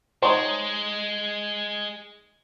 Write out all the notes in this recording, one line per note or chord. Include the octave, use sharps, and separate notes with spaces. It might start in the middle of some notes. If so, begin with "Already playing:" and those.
G#3 D#4 C5 C#5 F#5 A5 C6